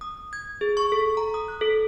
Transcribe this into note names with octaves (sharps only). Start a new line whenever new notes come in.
D#6
G#6
G#4
C#6
A4
A#5
D#6
F#6
A4